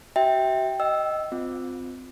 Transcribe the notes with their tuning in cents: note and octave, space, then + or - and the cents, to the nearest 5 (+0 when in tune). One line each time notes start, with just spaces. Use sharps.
F#4 +45 E5 -15 G5 +0
D#5 +0 G5 -30 E6 +0
C4 -20 F4 +20